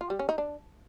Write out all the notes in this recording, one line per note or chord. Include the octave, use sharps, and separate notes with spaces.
F4
G3
C#4
D#4
D4